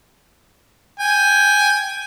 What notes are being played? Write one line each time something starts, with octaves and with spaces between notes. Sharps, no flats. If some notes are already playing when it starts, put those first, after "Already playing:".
G5 G#5